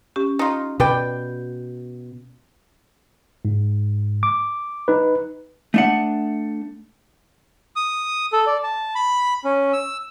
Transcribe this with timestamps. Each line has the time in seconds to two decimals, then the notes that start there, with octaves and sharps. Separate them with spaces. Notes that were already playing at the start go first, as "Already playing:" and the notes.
0.16 C#4 G4
0.39 D#4 F4
0.80 B2 B4 D5 G5
3.45 G#2
4.23 D6
4.88 D#4 B4
5.74 A3 D4 F#5
7.76 D#6
8.33 A4
8.47 D5
8.63 A5
8.95 B5
9.44 C#4
9.73 E6